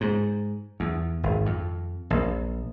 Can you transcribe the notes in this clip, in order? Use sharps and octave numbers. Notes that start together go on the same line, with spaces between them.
G#2
E2
G#1
F2
A#1